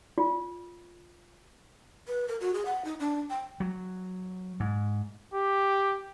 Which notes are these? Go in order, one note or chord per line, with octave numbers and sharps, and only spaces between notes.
F4
B4
A#4
F#4
G#4
F#5
D#4
D4
G5
F#3
G#2
G4